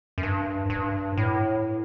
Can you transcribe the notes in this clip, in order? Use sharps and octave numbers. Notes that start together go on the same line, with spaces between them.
F#2
G2
G2
A2